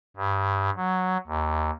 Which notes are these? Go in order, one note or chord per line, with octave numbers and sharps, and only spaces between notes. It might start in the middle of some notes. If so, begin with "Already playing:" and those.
G2
F#3
D#2